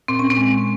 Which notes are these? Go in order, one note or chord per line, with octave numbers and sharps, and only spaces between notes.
A#2 C4
C#4
C4
G#3